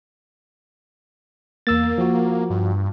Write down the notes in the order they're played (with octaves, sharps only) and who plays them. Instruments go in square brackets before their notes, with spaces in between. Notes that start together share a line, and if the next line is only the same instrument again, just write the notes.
[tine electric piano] E2 E6 A6 [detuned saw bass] A#3
[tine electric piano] F3 F#4
[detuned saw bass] G2